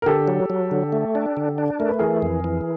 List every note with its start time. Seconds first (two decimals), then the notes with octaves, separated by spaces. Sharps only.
0.02 A#4
0.06 D3 G4 A4
0.28 F#3
0.50 F#3
0.71 D3
0.92 A3
1.15 D4
1.37 D3
1.58 D4
1.79 A3 A#4
1.89 B4
1.99 E3 G#4 A#4
2.22 F2
2.44 E3